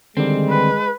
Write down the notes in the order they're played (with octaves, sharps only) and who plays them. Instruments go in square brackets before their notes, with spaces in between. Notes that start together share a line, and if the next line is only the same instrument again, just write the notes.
[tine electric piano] D3 D#3 G3 [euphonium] G#3 [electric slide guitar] C4
[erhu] B4